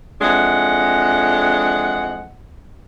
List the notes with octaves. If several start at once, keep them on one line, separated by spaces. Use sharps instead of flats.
F2 E3 G#3 D4 F#5